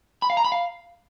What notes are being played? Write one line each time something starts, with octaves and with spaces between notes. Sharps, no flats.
B5
F5
A#5
B5
F5